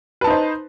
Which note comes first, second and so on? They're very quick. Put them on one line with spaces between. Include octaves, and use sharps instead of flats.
B4 A5 D#4 C5